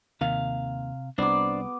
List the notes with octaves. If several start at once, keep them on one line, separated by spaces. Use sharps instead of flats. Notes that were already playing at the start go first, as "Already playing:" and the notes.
D#2 C3 D#3 F5
C2 B3 D4 C5 D5 D6